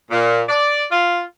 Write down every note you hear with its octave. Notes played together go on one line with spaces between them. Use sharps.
A#2
D5
F4